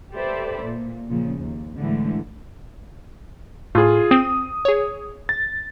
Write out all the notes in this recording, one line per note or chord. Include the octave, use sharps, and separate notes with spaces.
G4 A4 B4 C5 D5 E5
A#2
A#2 C#3 F3
D#2
A2 D3 E3 G#3 A3
A2 F4 G#4
C4 D#6
G#4 C#5
A6